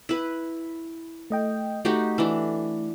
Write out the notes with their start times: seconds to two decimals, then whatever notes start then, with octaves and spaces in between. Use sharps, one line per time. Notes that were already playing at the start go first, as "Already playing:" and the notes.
0.09 E4 B4
1.30 A3 D#5 G5
1.85 A3 D#4 F#4 G4
2.18 E3 D4